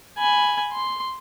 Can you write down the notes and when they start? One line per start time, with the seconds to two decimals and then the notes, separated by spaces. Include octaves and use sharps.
0.18 G#5 B5
0.72 C6